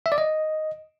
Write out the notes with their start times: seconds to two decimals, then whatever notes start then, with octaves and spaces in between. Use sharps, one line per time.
0.06 E5
0.12 D5
0.18 D#5